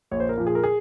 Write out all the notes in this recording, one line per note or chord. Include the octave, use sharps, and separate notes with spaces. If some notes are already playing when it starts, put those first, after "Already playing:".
A#1 C#5
C5
A#4
A#2 F3
G#4
A#4
G#4